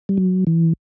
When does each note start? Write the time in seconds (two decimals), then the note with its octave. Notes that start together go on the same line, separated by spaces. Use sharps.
0.09 G3
0.17 F#3
0.47 E3